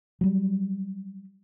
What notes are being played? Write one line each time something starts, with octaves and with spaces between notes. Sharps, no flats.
F#3 G3